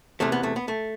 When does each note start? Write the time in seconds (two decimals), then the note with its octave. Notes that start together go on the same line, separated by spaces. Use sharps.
0.20 E2 C3 E3 A3
0.32 B3
0.43 A3
0.56 B3
0.68 A3